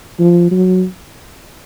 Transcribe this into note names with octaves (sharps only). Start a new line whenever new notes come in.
F3
F#3